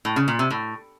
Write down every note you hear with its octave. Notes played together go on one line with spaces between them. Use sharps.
A2
C#3
A#2
C3
A2